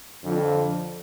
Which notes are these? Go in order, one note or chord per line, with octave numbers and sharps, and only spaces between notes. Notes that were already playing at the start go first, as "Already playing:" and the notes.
F2 D3 F3